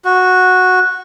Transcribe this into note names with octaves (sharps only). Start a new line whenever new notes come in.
F#4